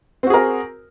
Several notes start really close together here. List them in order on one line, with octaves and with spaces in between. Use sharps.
C4 F#4 G#4 A#4